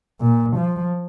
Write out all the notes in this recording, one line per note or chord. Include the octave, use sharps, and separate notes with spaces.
A#2
F3